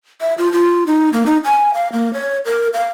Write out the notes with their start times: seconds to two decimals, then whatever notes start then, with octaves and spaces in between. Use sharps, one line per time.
0.21 E5
0.38 F4
0.53 F4
0.87 D#4
1.13 A#3
1.26 D#4
1.44 G#5
1.74 F5
1.93 A#3
2.14 C#5
2.46 A#4
2.74 F5